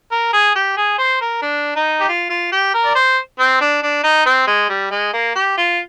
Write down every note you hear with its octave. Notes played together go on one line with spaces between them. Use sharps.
A#4
G#4
G4
G#4
C5
A#4
D4
D#4
G4
F4
F4
G4
A#4
D5
C5
C4
D4
D4
D#4
C4
G#3
G3
G#3
A#3
G4
F4